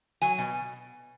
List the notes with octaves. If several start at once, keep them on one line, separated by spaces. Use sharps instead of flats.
F#3 G#5
B2